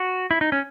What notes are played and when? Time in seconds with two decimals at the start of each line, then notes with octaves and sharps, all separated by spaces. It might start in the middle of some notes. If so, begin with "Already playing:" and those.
Already playing: F#4
0.31 E4
0.41 D#4
0.52 C#4